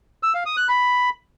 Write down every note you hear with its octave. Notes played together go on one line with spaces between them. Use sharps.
E6
F5
D#6
F#6
B5